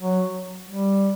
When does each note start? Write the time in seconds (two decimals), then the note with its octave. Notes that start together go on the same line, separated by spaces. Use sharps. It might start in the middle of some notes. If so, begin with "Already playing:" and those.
0.01 F#3
0.69 G3